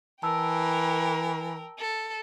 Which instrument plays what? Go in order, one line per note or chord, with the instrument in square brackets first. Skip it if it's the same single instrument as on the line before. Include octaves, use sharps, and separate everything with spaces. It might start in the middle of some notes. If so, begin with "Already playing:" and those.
[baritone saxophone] E3 [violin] A#4 G5 [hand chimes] A5 E6
[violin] A4